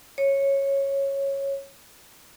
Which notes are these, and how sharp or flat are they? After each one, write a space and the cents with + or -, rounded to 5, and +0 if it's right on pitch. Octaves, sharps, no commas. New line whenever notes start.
C#5 -10